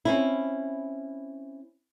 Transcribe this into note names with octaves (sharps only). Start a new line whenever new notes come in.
C4 C#4 E4